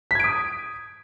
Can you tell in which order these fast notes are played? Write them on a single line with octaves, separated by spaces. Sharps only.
B6 G#6 D7 D#6